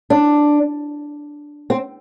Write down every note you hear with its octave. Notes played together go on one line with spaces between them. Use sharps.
D4
C4